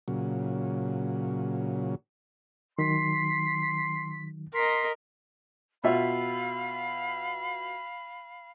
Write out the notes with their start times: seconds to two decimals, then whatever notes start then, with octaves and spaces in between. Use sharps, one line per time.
0.08 A#2 C#3 F#3
2.79 D#3 F#3 C6 B6
4.54 A#4 D#5 C6 B6
5.84 B2 F4 E5 F5 B5